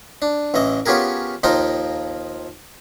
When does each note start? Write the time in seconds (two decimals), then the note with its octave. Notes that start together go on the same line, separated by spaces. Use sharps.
0.22 D4
0.54 A1 E3 D#5
0.86 B3 C#4 F4 G4 G#4 A#4
1.43 D#2 F3 D#4 F4 G5 A#5